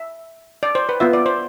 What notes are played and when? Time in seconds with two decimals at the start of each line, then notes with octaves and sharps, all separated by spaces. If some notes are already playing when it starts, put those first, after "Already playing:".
Already playing: E5
0.63 D5
0.75 C5
0.89 B4
1.00 B3 F4 E5
1.13 D5
1.26 C5